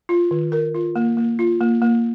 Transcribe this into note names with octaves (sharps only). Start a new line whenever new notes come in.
F4
D#3
A#4
F4
A#3
A#3
F4
A#3
A#3